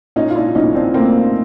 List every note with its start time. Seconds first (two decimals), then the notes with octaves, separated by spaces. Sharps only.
0.16 A#2 C#4 D#4
0.30 F4
0.36 D4 E4
0.55 B1 C#4 D#4
0.75 C4 D4
0.94 A3 A#3 C4